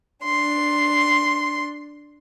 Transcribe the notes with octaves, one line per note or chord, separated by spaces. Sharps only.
D4 C6